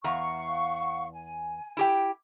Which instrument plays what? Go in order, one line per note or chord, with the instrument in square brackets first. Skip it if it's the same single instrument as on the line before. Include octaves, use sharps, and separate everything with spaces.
[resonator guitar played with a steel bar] E2 A#5 [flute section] F5 F#5 C#6
[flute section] G#5
[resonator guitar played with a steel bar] E4 G4 G5